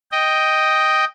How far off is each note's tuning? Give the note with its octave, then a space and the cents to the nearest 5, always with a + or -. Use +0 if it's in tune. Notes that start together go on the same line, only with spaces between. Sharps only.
D#5 +0 G5 +0